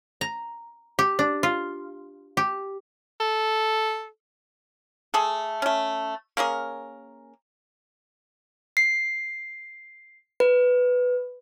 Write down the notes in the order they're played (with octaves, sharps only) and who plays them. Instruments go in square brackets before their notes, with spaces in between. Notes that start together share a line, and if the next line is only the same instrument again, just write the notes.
[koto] A#5
G4
D4
F4
G4
[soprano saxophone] A4
[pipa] A3 G#4 A4
A3 C#4
A#3 C#4 G#4 A#4
[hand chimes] C7
B4